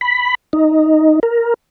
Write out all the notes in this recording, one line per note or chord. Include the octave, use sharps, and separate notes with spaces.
B5
D#4
A#4